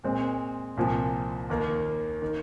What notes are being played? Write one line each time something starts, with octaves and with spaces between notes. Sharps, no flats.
A#2 G#3 C4
C2 A#2 F3
D#2 D#3 A#3
D#3